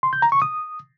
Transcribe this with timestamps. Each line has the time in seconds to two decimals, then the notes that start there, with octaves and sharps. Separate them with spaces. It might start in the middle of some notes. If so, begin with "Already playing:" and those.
0.03 C6
0.13 G6
0.22 A#5
0.32 C#6
0.42 D#6